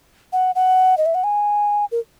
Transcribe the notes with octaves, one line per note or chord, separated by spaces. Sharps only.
F#5
F#5
D#5
E5
F#5
G#5
A#4